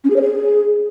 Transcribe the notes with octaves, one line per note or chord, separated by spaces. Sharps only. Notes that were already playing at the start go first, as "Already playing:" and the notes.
C#4
G#4
C#5
G#4